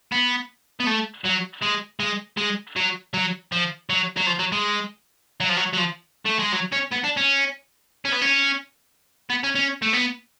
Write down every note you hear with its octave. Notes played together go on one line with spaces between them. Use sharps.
B3
B3
A3
F#3
G#3
G#3
G#3
F#3
F#3
F3
F#3
F#3
F3
F#3
G#3
F#3
F3
F#3
F#3
F3
A3
G#3
F#3
C#4
B3
D4
C#4
C#4
B3
C#4
B3
C#4
C#4
A3
B3